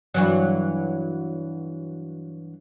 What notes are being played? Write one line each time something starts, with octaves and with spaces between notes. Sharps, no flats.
G2 E3 F#3